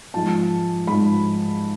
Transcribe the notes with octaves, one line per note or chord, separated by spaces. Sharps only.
G#2 F3 G#3 A5
G#2 F3 G#3 B5